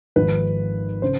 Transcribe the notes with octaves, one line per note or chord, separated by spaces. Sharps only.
G#1 G#2 F3 B4
C#3 C5